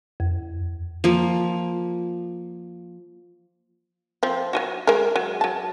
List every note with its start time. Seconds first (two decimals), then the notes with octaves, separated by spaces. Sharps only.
0.20 F2
1.04 F3 A#3
4.23 F3 C4
4.53 F#3 F4 F#4
4.87 G#3 A#4
5.16 F#3
5.41 F#3 A5